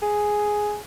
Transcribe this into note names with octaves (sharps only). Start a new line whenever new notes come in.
G#4